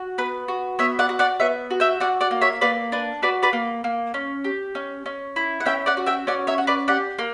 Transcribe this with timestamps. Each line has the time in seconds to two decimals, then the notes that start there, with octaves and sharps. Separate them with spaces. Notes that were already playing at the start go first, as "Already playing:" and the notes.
Already playing: F#4
0.18 B3 B4
0.48 F#4
0.79 B3 C#5 E5
0.99 D5 F#5
1.09 F#4
1.19 D5 F#5
1.40 B3 C#5 E5
1.71 F#4
1.80 E5 G5
2.00 F#4 D5 F#5
2.21 D5 F#5
2.31 A#3
2.41 C#5 E5
2.61 A#3 B4 D5
2.92 D4 B4
3.22 F#4 B4 D5
3.43 B4 D5
3.53 A#3
3.84 A#3
4.14 C#4
4.44 G4
4.75 C#4
5.06 C#4
5.36 E4
5.60 F#5
5.66 C#4 E5 G5
5.86 D5 F#5
5.97 F#4
6.06 E5 G5
6.27 C#4 D5 F#5
6.47 C#5 E5
6.58 F#4
6.67 B4 D5
6.88 G4 D5 F#5
7.19 A#3